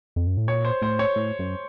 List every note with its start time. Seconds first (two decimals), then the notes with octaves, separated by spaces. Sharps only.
0.16 F2
0.27 F#2
0.37 A2
0.47 A#2 C#5
0.65 C5
0.82 A2 C5
0.99 C#5
1.16 A2
1.39 F#2